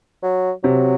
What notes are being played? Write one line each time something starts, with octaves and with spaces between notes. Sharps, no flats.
F#3
C3 F#3